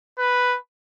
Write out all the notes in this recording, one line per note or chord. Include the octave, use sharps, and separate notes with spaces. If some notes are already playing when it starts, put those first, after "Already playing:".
B4